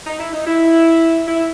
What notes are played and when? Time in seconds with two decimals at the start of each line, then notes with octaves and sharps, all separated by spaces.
0.06 D#4
0.20 E4
0.34 D#4
0.47 E4
1.27 E4